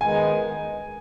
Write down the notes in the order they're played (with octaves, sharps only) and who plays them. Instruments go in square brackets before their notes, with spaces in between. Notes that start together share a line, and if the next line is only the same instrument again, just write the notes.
[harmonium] D#3 G#3 B3 D#4 [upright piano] G#5